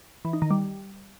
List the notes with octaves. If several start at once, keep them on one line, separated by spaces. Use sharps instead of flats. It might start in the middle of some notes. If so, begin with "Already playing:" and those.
E3
D#4
D#3
G3